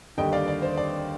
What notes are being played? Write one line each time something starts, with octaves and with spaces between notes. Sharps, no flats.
D#2 D3 G3 D#5 G5
D5 F5
D5
C5
D5